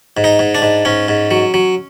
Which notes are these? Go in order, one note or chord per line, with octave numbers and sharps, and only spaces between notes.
G#2
D#4
G#2
D4
G#2
G#2 C#4
G#2
F#3
F#3